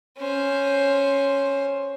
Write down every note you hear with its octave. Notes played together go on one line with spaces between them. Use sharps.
C#4 C5